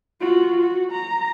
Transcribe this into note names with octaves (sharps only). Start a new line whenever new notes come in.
F4 F#4
F#4
A#5